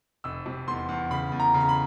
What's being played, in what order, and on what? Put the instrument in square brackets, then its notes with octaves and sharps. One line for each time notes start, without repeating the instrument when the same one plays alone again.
[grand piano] F1 E6
C3
E2 C6
E2
C#3 B5
E2
A#5
C#3
A#5
B5